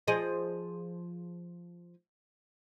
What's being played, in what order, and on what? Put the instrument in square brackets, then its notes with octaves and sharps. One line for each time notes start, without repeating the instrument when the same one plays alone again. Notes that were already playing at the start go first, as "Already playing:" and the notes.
[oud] F3 G#4 D#5